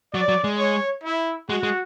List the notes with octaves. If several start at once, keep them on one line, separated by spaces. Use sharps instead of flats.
F#3 D5
F#3
G#3
C#5
E4
G#3 F#4
G#3